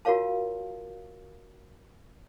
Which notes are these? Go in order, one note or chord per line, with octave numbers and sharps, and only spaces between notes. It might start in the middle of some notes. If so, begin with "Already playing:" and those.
F4 F#4 A#4 C#5 F5 A5